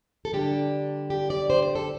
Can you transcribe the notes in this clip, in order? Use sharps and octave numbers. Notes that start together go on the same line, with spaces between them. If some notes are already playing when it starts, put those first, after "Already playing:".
A4
D3 G3 D4 G4
G4
D5
C5
D5
A4